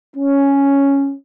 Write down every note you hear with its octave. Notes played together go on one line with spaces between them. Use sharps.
C#4